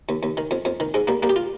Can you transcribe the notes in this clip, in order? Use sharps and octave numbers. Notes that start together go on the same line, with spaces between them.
D#2
D#2
D#3
F2
F2
D#3
G#2 G#3
G3 A#3
G3 A#3
G4
F4